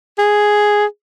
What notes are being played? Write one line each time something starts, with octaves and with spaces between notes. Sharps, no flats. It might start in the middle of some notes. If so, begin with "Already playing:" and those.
G#4